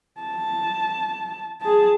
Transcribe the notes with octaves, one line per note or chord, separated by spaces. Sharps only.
A5
G#4 A5